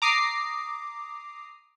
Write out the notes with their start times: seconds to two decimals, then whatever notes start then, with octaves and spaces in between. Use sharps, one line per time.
0.02 A#5 D6 D#6 C7